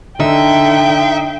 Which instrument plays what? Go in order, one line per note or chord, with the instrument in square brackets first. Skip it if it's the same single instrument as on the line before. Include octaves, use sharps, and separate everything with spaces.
[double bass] D3 [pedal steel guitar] D#4 [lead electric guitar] E5 [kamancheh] G5